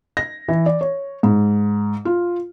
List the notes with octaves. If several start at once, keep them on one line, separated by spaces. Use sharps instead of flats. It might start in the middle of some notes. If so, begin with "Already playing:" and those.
A#6
E3
D5
C#5
G#2
F4